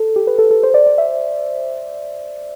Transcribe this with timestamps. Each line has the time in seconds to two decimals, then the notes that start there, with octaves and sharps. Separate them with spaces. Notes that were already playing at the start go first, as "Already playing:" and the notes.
Already playing: A4
0.16 G4
0.27 B4
0.39 A4
0.51 A4
0.63 C5
0.74 D5
0.86 D5
0.98 E5